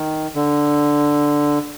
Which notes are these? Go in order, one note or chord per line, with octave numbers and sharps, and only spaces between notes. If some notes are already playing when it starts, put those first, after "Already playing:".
Already playing: D#3
D3